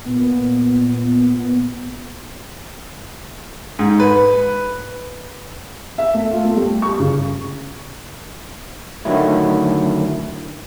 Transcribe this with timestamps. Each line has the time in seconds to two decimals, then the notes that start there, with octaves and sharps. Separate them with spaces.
0.05 A#2 B3
3.79 G#2
4.00 B4
5.98 E5
6.14 A3
6.31 F4
6.44 A3
6.56 G3
6.82 C#6
7.00 C#3
9.05 D3 D#3 F#3 A3 E4